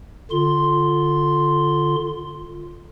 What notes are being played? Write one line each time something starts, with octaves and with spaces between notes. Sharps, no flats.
D3 F4 C6